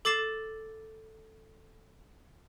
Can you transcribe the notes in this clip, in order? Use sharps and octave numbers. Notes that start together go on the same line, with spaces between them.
A4 D6 A6 C7 E7